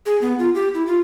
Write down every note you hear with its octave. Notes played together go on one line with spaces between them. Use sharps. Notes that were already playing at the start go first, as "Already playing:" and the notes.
G#4
B3
F4
G4
E4
F4